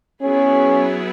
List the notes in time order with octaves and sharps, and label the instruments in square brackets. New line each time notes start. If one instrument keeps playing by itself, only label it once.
[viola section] F#3 B3 E4 G#4 [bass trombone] C#4